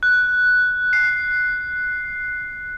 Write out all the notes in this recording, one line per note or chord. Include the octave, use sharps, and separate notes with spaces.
F#6
C7